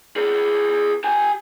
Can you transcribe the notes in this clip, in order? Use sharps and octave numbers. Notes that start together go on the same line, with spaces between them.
G#4 B4
G4 G#5